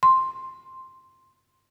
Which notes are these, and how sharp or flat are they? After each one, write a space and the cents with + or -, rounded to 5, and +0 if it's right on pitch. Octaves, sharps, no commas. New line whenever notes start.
C6 +5